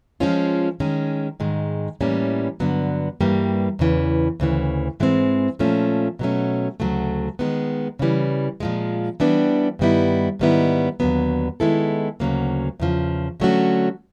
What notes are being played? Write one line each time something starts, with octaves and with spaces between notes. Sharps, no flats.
F3 G#3 C#4 F4
D#3 G#3 C#4
G#2 D#3 G#3
A2 E3 G3 A#3 C#4
G2 D3 F#3 B3
G2 E3 G3 A#3
E2 C#3 E3
D2 C#3 E3
G#2 E3 G#3 C4
A#2 F3 A3 C#4
B2 F#3 A3 C#4
D2 C#3 F#3 A3
D#3 G#3 B3
C#3 E3 G3
A#2 F3 G#3
E3 G3 B3 D4
G2 D#3 G3 B3 E4
G#2 D#3 G3 B3 E4
D#2 D3 F#3 B3
D#3 G#3 B3 E4 A4
D2 C#3 F#3 A#3
E2 C#3 F3
D3 F#3 A3 C#4 F#4